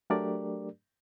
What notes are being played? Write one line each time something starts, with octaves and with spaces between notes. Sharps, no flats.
F#3 A3 D4 G4 A#4 D5